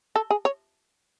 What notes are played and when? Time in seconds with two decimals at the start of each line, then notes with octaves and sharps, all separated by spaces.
0.16 A4
0.31 G#4
0.45 C#5